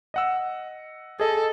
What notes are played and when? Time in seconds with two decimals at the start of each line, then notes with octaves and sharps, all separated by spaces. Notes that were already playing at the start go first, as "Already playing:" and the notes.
0.14 D#5 F#5 E6
1.20 G#4 A4 D#5